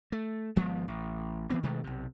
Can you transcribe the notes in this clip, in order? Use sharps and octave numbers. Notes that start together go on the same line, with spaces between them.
A3
G#1 F3 G#3 B3
A1
E3 B3 C4
B2 D#3 G#3 A3
B1 C3